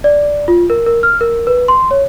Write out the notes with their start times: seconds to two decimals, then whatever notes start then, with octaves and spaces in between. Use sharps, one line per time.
0.04 D5
0.48 F4
0.70 A#4
0.86 A#4
1.03 F6
1.21 A#4
1.47 B4
1.68 C6
1.91 C#5